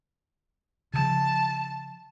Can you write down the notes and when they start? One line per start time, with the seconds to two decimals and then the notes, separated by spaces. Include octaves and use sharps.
0.94 C#3 F3 A5